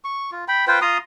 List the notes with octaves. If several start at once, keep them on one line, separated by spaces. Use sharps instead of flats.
C#6
F4
G5 B5
F4 B4 C5 G5
F4 A#5 C6 D#6